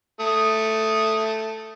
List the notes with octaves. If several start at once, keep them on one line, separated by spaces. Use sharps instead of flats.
A3 D#6